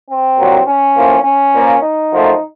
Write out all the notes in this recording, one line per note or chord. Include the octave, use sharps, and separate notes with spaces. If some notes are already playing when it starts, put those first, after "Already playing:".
C4
C2 A#2 F#3
C#4
A2 F3 A#3
C#4
A#2 F3 A#3
D#4
F#2 F3 A3